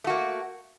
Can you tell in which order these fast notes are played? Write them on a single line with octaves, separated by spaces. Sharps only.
A3 F#4 A#3